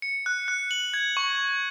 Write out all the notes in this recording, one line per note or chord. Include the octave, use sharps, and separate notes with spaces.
C#7
F#6
F#6
F#7
G#6
C#6